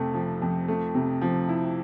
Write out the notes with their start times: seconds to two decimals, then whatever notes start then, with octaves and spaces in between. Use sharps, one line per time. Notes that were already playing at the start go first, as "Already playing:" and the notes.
Already playing: F2 C3 A3
0.14 F3
0.42 F2
0.68 A3
0.95 C3
1.22 F3
1.49 E4